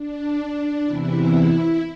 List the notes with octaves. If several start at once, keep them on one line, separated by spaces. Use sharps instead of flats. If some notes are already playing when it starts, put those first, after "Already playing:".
Already playing: D4
E2 C3 E3 E4